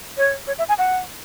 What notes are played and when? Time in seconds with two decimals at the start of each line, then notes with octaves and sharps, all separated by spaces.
0.18 C#5
0.47 C#5
0.59 E5
0.69 G#5
0.78 F#5